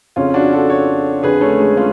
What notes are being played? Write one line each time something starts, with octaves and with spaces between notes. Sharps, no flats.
F2 C#3 C#4 F4
D4 F#4
F#4 A4
A4 C#5
F2 D3 G#4 B4
A3 C#4
G#3
C#4 F4